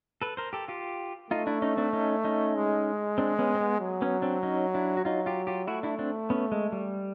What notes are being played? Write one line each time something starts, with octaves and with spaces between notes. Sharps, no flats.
A4 B4
A#4 C5
G4 A4
F4 G4
A3 D#4 F4
D4 E4
C#4 D#4
C4 D4
C#4 D#4
C#4 D#4
G#3
C4 D4
B3 C#4
C4
B3
F#3
B3 C#4
C4 D4
C#4 D#4
D4 E4
F#4
F#3 D#4 F4
F4 G4
F4 G4
A3 E4 F#4
D4 E4
C4 D4
B3 C#4
G#3
G3